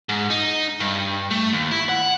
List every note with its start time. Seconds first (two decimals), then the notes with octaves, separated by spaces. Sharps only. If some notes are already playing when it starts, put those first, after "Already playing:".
0.09 G#2
0.30 D#4
0.80 G2
1.31 A3
1.52 D#2
1.71 E4
1.89 F#5